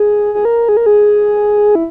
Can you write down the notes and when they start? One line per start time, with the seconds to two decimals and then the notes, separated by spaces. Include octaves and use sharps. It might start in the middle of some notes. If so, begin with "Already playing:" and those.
Already playing: G#4
0.34 G#4
0.45 A#4
0.69 G#4
0.77 A#4
0.86 G#4
1.75 E4